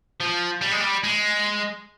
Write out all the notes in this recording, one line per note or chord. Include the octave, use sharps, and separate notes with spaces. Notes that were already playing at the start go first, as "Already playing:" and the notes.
F3
G3
G#3
G3
G#3